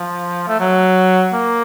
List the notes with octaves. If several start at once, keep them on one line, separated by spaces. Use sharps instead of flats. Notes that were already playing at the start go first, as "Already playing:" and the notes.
Already playing: F3
A3
F#3
A#3